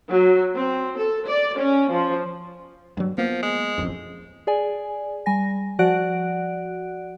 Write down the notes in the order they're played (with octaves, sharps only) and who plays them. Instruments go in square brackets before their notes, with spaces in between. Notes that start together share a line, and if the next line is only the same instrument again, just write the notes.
[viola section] F#3
C4
A4
D5
C#4
F3
[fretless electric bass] G2 F#3
[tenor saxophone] F3 [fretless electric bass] A#3 B3
[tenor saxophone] G#3
[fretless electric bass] E1 A1 F2
[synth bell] G#4 D5 G#5
G3 G#5 A#6
F3 F#4 D5 F#5 F#6 D7